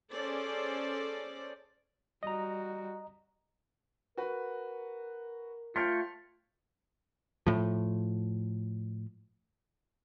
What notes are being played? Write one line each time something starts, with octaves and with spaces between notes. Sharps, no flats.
C#4 G#4 A4 C5 D5
G3 F#4 D#5 A#5
F#4 A#4 B4
A3 F4 C#5 G5 C6 F6
A2 F3